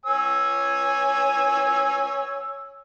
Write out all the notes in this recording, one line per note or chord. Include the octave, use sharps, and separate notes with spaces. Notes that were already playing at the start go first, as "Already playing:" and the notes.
C#5 G#5 E6